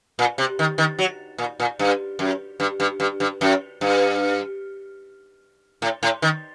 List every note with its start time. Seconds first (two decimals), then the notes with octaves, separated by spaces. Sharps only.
0.19 A#2
0.38 C3
0.59 D#3
0.78 D#3
0.99 F#3
1.38 A#2
1.60 A#2
1.79 G2
2.19 F#2
2.60 G2
2.80 G2
3.00 G2
3.20 G2
3.41 F#2
3.81 G2
5.82 A2
6.03 A2
6.22 D#3